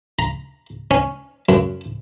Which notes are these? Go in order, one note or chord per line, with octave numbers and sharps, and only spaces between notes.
A#5
C#4
F#2